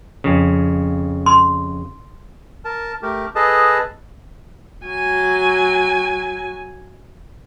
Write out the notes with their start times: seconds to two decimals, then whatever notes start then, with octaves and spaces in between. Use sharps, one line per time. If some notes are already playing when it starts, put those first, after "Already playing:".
0.24 F2 C#3
1.26 C6
2.65 A#4 A5
3.02 A3 G4 A#4
3.35 G#4 A4 B4 D#5 A5
4.86 F#3 G#5